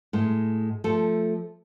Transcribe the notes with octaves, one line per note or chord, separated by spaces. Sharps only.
A2 G#3
F3 A3 A4